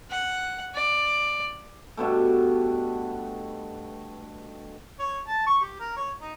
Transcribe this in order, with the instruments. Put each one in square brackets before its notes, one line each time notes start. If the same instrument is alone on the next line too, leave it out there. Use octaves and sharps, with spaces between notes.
[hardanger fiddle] F#5
D5
[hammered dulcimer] G2 B2 A3
[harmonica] C#5
A5
C#6
G4
A#4
C#5
D#4